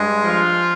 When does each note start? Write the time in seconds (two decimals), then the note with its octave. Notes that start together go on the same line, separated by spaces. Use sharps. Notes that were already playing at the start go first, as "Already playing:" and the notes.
Already playing: G2 G#3
0.24 F3 F4